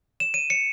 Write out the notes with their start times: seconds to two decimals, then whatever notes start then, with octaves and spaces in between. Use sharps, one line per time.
0.20 E7
0.34 D#7
0.50 C#7